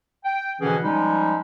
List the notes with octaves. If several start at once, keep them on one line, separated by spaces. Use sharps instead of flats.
G5
B2 D3 E3 F3 C#4 G#4
F3 G3 G#3 C#4 D#4